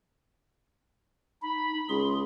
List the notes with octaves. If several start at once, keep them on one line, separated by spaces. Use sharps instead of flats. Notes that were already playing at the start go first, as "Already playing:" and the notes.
D#4 B5
C#2 G#4 C6